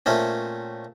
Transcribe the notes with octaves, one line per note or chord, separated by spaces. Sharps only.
A#2 A3 C4 C#4